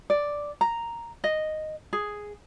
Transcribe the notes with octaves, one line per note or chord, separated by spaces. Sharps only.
D5
A#5
D#5
G#4